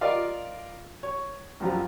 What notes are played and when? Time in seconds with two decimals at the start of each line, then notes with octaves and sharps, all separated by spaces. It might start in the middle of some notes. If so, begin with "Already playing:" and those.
0.01 F4 A#4 D5 D#5 F5
1.03 C#5
1.60 C2 F#2 F3 F#3